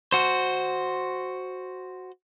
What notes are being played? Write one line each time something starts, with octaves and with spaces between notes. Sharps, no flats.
F#4 C5